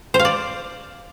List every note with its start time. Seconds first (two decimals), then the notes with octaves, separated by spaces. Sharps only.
0.14 C5
0.19 F5
0.25 D5